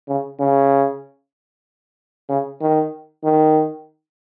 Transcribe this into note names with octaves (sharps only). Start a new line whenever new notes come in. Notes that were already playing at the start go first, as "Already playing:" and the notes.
C#3
C#3
C#3
D#3
D#3